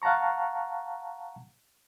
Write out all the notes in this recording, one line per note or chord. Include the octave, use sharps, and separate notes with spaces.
F5 F#5 A5 A#5 C#6